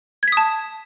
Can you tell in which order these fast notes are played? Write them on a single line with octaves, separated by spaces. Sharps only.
G#6 B6 D#6 A5